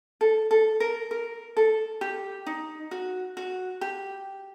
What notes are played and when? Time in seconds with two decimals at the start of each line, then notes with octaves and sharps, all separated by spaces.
0.21 A4
0.51 A4
0.80 A#4
1.11 A#4
1.57 A4
2.01 G4
2.46 D#4
2.91 F#4
3.37 F#4
3.81 G4